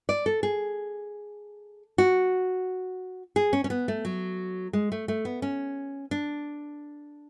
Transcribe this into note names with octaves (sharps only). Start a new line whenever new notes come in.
D5
A4
G#4
F#4
G#4
C#4
C#4
B3
A3
F#3
G#3
A3
A3
B3
C#4
D4